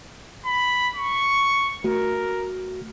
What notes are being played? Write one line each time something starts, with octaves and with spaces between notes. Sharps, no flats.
B5
C#6
A3 F#4 A#4